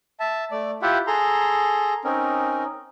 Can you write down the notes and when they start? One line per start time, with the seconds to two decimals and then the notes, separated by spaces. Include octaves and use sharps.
0.20 E5 A5
0.51 A3 D5
0.82 E4 F4 G4 E5 F#5
1.07 G#4 A4 A#5 C6
2.04 C4 C#4 D#4 A#4